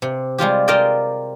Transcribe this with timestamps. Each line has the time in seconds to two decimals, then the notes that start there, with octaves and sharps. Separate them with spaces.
0.02 C3
0.38 G3 G#3 F4 G4
0.68 F4 A#4 C5 D5 D#5 G5